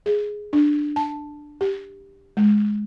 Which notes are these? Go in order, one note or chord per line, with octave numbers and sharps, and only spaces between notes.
G#4
D4
A5
G4
G#3